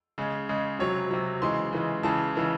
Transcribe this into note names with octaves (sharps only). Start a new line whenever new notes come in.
C#3 G#3
C#3 G#3
C3 F#3 C#5
C3 F#3
C#3 E3 G#3 C6
C#3 E3 G#3
C#3 E3 G#3 A5
C#3 E3 G#3